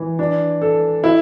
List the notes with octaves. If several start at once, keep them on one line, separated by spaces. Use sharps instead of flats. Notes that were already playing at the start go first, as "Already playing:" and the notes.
Already playing: E3
D4
A4
E4